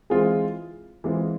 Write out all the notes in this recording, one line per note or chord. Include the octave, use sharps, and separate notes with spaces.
E3 G#3 C4 F4 G#4
E3 G#3 C4 F4 G#4